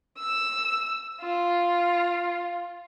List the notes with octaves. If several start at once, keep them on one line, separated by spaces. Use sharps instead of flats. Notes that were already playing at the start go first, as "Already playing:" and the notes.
E6
F4